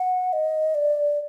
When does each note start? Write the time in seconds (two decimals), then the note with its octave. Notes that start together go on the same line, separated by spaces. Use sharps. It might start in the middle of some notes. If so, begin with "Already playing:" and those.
Already playing: F#5
0.33 D#5
0.75 D5